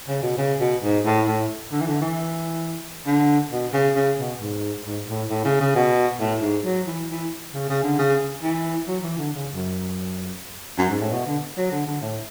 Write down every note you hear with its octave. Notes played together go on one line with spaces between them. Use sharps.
C#3
B2
C#3
B2
G#2
A2
A2
D3
E3
D3
E3
D3
B2
C#3
C#3
B2
G#2
G#2
A2
A2
C#3
C#3
B2
A2
G#2
F#3
E3
E3
C#3
C#3
D3
C#3
E3
F#3
E3
D3
C#3
F#2
F#2
G#2
A2
B2
D3
F#3
D3
D3
A2